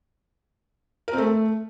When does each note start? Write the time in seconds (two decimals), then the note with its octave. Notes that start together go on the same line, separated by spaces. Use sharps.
1.08 A#4
1.13 C4
1.18 A3